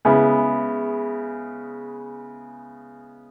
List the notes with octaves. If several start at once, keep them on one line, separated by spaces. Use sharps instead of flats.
C#3 G#3 B3 E4